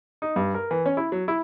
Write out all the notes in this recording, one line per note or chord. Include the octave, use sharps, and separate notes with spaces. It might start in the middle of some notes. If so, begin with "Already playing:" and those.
D#4
G2
A#4
E3
C#4
E4
F#3
E4